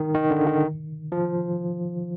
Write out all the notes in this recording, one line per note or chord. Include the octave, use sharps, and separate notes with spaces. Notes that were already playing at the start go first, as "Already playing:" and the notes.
Already playing: D#3
D#3
D3
D#3
F3